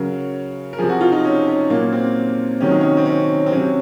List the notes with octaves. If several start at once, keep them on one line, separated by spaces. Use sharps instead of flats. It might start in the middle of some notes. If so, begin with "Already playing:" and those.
Already playing: C#3 F#3 A#4
A#4
C3 F3 G#4
F#4
F4
D#4
C#4
C#4
A#2 F#3 A#3
C4
C3 D#3 F#3 C#4
D#4
C#4
C4
C#4
C4
C3 F#3 C#4